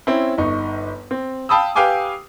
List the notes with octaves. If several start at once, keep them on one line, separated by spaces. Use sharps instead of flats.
C4 C#4 E4
G1 D#4 C#6
C4
F5 G5 A5 B5 D#6 E6
G4 B4 F5 G5 G#5 D6